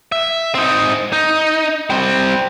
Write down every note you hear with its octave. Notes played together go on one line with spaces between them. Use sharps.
E5
C4 D#4
D#4
G3 C4